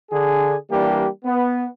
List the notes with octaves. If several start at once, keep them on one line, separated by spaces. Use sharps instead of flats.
D3 G#4
E3 G3 A#3 D4 G4
B3